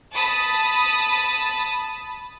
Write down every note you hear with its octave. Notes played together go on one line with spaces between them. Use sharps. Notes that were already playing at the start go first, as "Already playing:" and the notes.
A5 B5 D#6